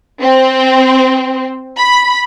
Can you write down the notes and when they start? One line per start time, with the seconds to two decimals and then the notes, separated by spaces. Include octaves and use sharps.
0.21 C4
1.78 B5